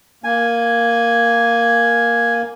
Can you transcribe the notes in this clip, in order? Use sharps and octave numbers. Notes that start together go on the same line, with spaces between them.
A#3 G#5